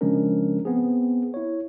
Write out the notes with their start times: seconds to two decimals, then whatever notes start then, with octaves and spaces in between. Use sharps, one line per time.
0.01 C#3 F3 G#3 C#4 D4 A#4
0.65 B3 C4 G#4
1.34 E4 C#5